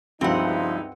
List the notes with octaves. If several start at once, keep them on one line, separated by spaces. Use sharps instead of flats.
C#2 G2 F3 C4 D#4 E4 F#4 F#5